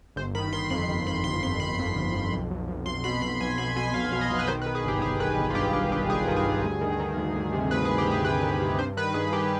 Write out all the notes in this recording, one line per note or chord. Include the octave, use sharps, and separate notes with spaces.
G1 C5
D#3 B5
D#3 C6
F2 B5
G1
F2 B5
G1 C6
F2 C6
G1 B5
F2
G1
F2
B1
B1
B1
B1 C6
B2 B5
B1 B5
B1 G#5
B2 B5
B2 G#5
B1 F5
B2
D#5
B1
B4
D#3 C5
B4
D#3
G#4
G1 G4
G1 G#4
D#3 B4
G1
F4
G2 G4
G2 G4
G2 G4
G1 G#4
D#3
G#4
G2
D2
D#3
D#3
D2
D2
C3
D2 B4
G#4
D2
G4
D2 G#4
C3 B4
D#3
C3
G2 C5
D#3 B4
G2 G#4
D#3 G4